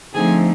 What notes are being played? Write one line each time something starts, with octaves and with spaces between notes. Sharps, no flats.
D3 F3 A3 C4 D#4 G#4 G#5